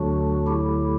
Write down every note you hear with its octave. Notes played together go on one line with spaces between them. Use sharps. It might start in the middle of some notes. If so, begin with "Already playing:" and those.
Already playing: D2 D3 F#3 D4 F#4
E4 G4